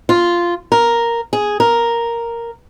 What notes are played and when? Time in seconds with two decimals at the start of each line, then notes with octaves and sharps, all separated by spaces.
0.09 F4
0.72 A#4
1.33 G#4
1.60 A#4